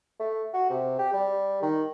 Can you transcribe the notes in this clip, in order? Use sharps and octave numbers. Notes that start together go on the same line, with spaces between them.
A3
F#4
C3
G4
G3
D#3